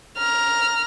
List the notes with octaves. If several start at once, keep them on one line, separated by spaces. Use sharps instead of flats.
A#5 F6